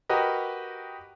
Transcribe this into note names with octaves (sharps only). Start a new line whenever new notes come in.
F#4 G4 A#4 B4 D#5